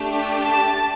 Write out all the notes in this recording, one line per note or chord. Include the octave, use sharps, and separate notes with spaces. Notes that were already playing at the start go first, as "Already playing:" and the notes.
Already playing: A3 D4 G4
A5